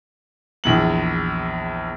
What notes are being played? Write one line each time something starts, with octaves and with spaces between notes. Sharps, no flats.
A#1 E2 F#7